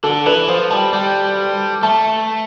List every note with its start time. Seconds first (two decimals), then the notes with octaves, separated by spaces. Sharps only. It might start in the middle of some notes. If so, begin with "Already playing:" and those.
0.03 D3 A4
0.26 E3 B4
0.48 F3 C5
0.70 G3 A5
0.93 G3 G5
1.83 A3 A5